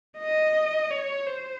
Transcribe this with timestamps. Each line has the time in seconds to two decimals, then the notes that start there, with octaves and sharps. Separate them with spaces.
0.19 D#5
0.91 C#5
1.27 C5